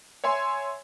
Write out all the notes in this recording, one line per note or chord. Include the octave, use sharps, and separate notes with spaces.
C#5 E5 G#5 C6